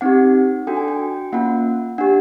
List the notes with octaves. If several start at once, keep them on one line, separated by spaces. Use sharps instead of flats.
C4 D#4 G4 F#5
D4 F#4 A4 G5
G#5
G5
A#3 C#4 F4 F#5
D4 G4 F#5